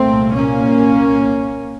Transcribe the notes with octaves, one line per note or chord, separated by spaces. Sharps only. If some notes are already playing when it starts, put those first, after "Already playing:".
Already playing: C2 A#2 A3 C4
A#3 C#4